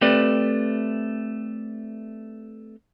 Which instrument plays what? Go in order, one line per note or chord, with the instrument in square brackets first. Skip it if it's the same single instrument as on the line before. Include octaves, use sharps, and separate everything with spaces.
[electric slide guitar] A3 C4 G4 B4 D5